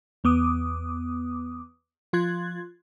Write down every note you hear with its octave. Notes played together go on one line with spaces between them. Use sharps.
E2 B3 D6 D#6
F3 F4 C6 F#6 G#6 A6